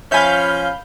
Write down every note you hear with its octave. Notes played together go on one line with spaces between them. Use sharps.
F3 C#4 E5 F5 G#5 B5 G6